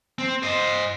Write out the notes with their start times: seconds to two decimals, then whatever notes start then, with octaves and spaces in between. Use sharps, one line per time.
0.18 C4
0.43 C5 D#5